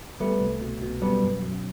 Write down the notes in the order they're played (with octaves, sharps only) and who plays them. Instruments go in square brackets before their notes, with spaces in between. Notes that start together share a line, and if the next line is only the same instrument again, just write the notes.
[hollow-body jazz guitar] G3 B3 [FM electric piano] A3
[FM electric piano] C2
B2
B2
[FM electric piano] F#2 [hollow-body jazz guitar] G3 B3
[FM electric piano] F#2
F#2